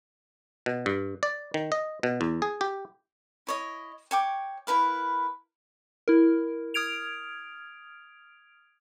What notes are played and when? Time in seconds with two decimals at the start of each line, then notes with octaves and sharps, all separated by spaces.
0.66 B2
0.86 G2
1.23 D5
1.54 D#3
1.72 D#5
2.03 B2
2.21 E2
2.42 G#4
2.61 G4
3.47 E4 C#5 D#5
4.11 C#5 G5 D6
4.67 E4 A#4 B4 F5
6.08 E4 A#4
6.74 D#6 F6 G#6 D7 F7